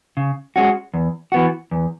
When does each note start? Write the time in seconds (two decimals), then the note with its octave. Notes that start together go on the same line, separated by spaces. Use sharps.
0.17 C#3
0.56 G#3 C#4 F#4
0.94 E2
1.32 E3 B3 F#4
1.71 E2